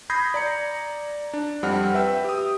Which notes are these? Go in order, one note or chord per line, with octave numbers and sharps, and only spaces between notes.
B5 D#6 G6 G#6 A#6 C7
D5 A#5 C#7
D4
F2 G3 C4 F#5 F6
B4 E5 G5 E6
G4 D#6